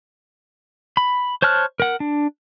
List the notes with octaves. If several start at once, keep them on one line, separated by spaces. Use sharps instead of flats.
B5
C5 C#5 A5 F6 F#6
A#4 F#5
D4